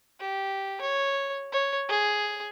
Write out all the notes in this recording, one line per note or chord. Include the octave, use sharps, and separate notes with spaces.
G4
C#5
C#5
G#4